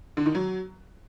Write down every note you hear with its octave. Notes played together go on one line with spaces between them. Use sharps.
D3
D#3
F#3